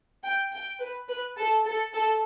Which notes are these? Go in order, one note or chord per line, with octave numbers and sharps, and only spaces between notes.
G5
G5
B4
B4
A4
A4
A4